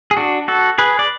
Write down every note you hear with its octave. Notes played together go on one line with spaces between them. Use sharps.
G#4
D4 F#4
F#4 A4
G#4 B4
D5